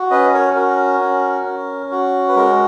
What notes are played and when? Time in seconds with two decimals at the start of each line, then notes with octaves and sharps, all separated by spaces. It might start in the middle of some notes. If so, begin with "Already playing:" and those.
Already playing: F#4
0.10 C#4 B4 D#5
0.34 A#4 C#5
0.55 F#4 A#4
1.00 C#4
1.45 C#4
1.91 F#4
2.28 B4
2.35 G#3 A#4